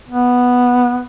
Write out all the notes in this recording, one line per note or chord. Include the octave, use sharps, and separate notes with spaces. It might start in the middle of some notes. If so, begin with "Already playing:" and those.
B3